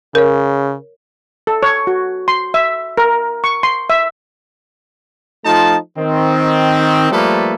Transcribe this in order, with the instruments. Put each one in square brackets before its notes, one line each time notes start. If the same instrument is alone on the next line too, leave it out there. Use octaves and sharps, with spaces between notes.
[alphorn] C#3 [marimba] A#4 C#5
[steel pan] A4
C#5
F#4
C6
E5
A#4
C#6
C6
E5
[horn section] F3 A3 D#4 F4 A5
D#3 C4
F3 G3 A3 A#3 A4 B4